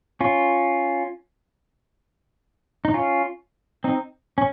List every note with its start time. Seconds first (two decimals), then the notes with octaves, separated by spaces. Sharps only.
0.21 C#4 F4
2.85 D#4
2.94 C#4 F4
3.84 C4 D#4
4.38 C#4